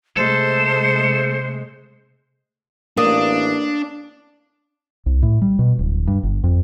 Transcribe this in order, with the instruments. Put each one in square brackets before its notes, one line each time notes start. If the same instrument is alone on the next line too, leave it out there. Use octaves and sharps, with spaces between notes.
[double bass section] C3 G#3 A3 [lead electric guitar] A4 [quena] C5
[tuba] A1 [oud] A#3 [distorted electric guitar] D4 [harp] D#6
[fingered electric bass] C2
A2
G3
B2
D1
G2
G1
F2